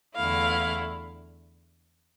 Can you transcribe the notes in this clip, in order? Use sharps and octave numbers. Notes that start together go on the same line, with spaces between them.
E2 D3 A3 E4 F5